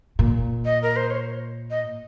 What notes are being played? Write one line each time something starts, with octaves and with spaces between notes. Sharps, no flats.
A#2
D#5
A#4
C5
C#5
D#5